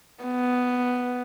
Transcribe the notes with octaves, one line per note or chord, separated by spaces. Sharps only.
B3